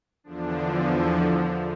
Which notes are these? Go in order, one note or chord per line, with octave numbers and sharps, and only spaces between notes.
E2 D3 F3 D4